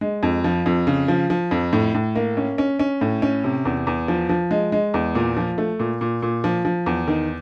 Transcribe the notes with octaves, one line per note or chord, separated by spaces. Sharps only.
G#3
F2
F3
F2
C#3
F3
F3
F2
A2
A2
A#3
C#4
C#4
C#4
A2
C#4
C3
E2
E2
F3
F3
G#3
G#3
E2
A#2
F3
A3
A#2
A#2
A#2
F3
F3
E2
D#3